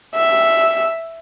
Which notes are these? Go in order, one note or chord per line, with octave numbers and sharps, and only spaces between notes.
E5